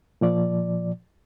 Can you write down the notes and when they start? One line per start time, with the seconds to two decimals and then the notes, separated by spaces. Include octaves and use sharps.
0.21 A#2 F3 D5